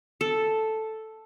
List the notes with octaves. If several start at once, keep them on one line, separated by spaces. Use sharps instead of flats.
A4